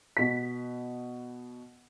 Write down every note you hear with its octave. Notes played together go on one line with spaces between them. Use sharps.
B2 B6